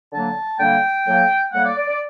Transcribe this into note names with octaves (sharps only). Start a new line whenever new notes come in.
D3 F#3 A#3 A5
D3 G3 A#3 G5
A2 F#3 A#3
A2 G3 A#3 F#5
D5
D5
D5